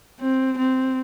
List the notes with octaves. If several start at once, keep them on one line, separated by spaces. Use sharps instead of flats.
C4
C4